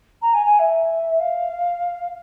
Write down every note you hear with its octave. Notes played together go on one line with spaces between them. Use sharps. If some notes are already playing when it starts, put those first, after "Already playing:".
A#5
G#5
G#5
E5
F5